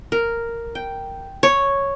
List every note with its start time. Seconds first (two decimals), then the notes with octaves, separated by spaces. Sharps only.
0.12 A#4
0.75 G5
1.43 C#5